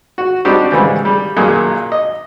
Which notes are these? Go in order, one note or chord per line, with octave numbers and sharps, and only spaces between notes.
F#4
G3 C4 D4 D#4 F#4 G4
G#2 C#3 E3 G3
G3
B1 F#2 A#2 A#3 G#4
D#5